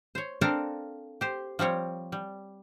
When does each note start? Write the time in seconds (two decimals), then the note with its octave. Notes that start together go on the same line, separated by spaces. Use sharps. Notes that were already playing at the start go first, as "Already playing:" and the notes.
0.15 C5 C#5
0.41 C4 D4 A4 A#4 F5 A#5
1.21 G4 C5
1.59 F3 G3 C4 C#5
2.12 G3